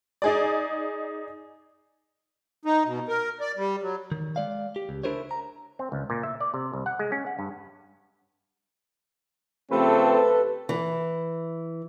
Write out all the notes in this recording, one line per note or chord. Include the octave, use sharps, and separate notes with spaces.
D#4 G#4 D5
D#4
B2
A#4
D5
G3
F#3
D#3
G#3 D5 F5
G4
C#2
D4 E4 F4 A#4 C5 C#5
A#5
C4
C#2
A#2
E5
D5
C3
C2
F#5
G#3
C#4
F#5
G2
C#3 F3 A3 C4 G4 A4 B4
E3